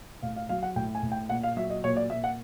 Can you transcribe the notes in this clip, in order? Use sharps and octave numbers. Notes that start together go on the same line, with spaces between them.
A2 F5
F5
F#3 F5
F#5
A2 G5
G#5
A2
G5
A#2 F#5
F5
F#3 E5
D#5
A#2 C#5
D5
A#2 E5
F#5